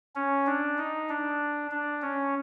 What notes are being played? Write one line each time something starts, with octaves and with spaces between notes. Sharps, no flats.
C#4
D4
D#4
D4
D4
C#4